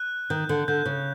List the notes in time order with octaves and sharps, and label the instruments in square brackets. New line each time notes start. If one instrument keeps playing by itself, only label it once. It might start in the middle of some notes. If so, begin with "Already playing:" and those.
Already playing: [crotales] F#6
[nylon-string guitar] D#3 [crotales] G6
[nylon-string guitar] D3
[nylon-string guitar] D3 [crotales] G6
[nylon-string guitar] C#3